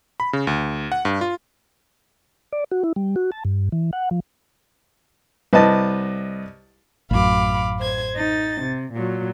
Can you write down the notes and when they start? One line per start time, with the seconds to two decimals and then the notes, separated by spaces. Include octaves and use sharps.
0.20 B5
0.33 C#3
0.47 D2
0.92 F#5
1.05 G2
1.21 F4
2.53 D5
2.72 F#4
2.84 E4
2.96 G3
3.16 F#4
3.32 A5
3.45 G2
3.72 E3
3.93 F#5
4.11 F3
5.53 C2 B4 D#5 A5
7.11 A1 F#2 F5 B5 D6
7.79 C5 G#6
8.15 D#4 A6
8.61 C3
8.93 A#2 F#3